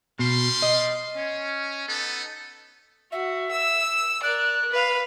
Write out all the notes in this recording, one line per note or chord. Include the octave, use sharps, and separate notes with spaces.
B2 G3 F5 C6
D#5
C#4
B3 D#4 A4
F#4 E5
E6
A#4 D5 F#6
B4 F5